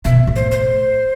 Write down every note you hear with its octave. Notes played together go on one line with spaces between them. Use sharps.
B2 E5
A2
C5
C5